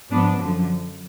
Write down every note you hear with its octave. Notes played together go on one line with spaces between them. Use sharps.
G#2 F3 B3 D4
F#2 D3 F3